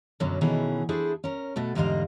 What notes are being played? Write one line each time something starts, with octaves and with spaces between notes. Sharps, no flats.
F#2 B2 D3 F#3 C#4
B2 D#3 E3 C#4 G#4 A4
D4 E4 G#4 A4 C5
C#4 A#4
B2 A3 F#4 A4
E2 G#2 D3 G3 D#5 F5